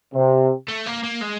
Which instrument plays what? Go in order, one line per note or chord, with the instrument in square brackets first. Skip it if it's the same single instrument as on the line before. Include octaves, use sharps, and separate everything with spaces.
[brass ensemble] C3
[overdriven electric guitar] A3
A#3
A#3
G#3